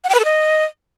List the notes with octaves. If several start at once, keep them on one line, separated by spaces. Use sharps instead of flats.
F#5
G5
B4
A4
D#5